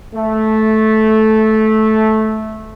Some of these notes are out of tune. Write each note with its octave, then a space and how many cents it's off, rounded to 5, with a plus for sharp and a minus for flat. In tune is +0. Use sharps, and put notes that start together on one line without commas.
A3 -10